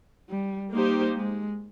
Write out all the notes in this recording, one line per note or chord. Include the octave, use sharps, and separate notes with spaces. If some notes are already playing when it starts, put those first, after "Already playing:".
G3
G3 A#3 D#4 G4 C5
G#3